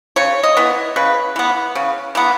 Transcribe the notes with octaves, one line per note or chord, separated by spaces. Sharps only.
C#3 C#5
D#5
E3 B3
C#3 B4
E3 B3
C#3
E3 B3